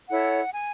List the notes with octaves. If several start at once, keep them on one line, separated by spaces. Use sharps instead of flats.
E4 A4 C#5 F#5
G#5